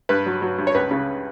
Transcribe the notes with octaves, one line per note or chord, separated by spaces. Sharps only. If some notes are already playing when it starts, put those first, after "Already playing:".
G2 B4
F#3
F#3
G2
C#5
C#2 B4
C#3